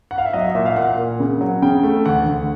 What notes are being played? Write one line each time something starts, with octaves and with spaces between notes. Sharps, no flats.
F#5
F5
E5
F#3 D#5
E5
A#2 E5
F5
A#2 F#5
A#2
C#3
F#3
C#3 G5
A3
D2 F#5
D2